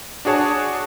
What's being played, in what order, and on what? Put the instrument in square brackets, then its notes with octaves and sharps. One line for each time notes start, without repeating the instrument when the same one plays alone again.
[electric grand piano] D4 F#4 G#4 C#5 A5